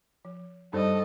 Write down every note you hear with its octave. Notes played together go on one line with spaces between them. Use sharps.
F3
G2 D#4 A4 C5 D5 D#5